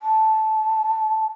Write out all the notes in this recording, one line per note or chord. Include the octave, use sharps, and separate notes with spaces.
A5